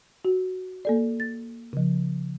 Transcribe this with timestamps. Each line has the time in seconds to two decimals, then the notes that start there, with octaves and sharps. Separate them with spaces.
0.25 F#4
0.85 A#3 A4 D5
1.20 A6
1.73 C#3 F3